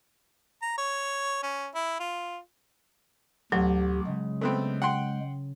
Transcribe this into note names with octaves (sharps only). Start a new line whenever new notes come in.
A#5
C#5
C#4
E4
F4
A1 D2 F#3 G4
C#3 G#3
A3 B3 C4
F#5 G5 C6